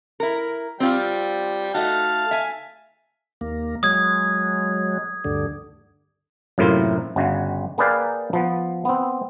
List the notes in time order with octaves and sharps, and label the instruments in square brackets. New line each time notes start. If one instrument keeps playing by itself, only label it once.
[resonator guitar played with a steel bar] E4 A#4
[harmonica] G3 G5 [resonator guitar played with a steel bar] C4 F4
[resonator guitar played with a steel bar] A3 D#4 F#4 [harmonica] F5 A5
[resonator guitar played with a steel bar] E5 G#5
[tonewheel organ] D#2 A#3
[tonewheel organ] F#3 G#3 [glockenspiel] D#6 G#6
[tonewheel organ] D2 G2 D3
[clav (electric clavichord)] F#2 A2 C3 A#3 E4 F4
G1 C#3 F#4
A#3 G#4 B4 D5 F5 G5
F3 B3
B3 C4